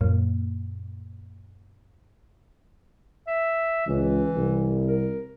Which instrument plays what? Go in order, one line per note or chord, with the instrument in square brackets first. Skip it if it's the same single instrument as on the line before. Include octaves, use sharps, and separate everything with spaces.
[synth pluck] F#2 A#2 A#3
[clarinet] E5
[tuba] C#2 [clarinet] E3
[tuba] C2
[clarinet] A#4